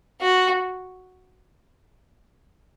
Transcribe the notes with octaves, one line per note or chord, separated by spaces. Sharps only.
F#4